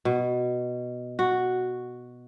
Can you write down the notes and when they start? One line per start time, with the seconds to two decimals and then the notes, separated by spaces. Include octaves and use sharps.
0.05 B2
1.19 F#4